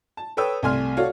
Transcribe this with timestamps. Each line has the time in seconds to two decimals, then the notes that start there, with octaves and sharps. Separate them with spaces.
0.17 A5
0.37 A4 B4 C#5 G5 D#6 E6
0.63 C2 A3 G#5 C6 F6
0.97 F#4 A4 C#5 D5 F5